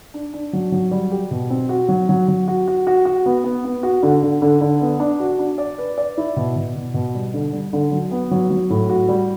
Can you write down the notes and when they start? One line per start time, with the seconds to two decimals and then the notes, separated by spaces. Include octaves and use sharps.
0.14 D4
0.34 D4
0.53 F#3
0.72 F#3
0.91 G3
1.12 G4
1.31 B2
1.50 C4
1.69 F#4
1.89 F#3
2.09 F#3
2.28 F#3
2.48 F#4
2.68 F#4
2.87 F#4
3.05 F#4
3.26 B3
3.44 B3
3.65 B3
3.83 F#4
4.03 D3
4.23 D3
4.42 D3
4.61 D3
4.81 B3
5.00 D4
5.20 F#4
5.39 D4
5.58 D5
5.79 B4
5.98 D5
6.17 E4
6.36 B2
6.56 B2
6.76 B2
6.94 B2
7.15 G3
7.34 D3
7.53 G3
7.73 D3
7.92 F#3
8.11 B3
8.31 F#3
8.50 F#3
8.70 A2
8.89 F#4
9.09 G3